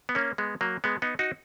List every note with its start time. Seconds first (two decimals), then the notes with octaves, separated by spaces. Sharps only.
0.09 B3
0.15 A#3 C#4
0.38 G#3 B3
0.61 F#3 A#3
0.84 G#3 B3
1.02 B3 D#4
1.19 D#4 F#4